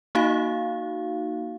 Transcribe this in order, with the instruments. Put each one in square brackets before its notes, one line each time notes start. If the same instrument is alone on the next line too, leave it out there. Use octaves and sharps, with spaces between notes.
[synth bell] A#3 D#4 F#4 F5